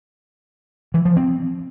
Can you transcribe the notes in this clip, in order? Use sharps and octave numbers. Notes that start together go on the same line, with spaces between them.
E3
F3
C4